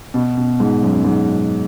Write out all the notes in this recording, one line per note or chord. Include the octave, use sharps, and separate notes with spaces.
B2
B2
G#2
F#2
G#2